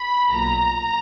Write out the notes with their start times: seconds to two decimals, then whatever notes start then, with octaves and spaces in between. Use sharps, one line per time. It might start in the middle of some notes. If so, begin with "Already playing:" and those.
Already playing: B5
0.30 B1 A#2 A#5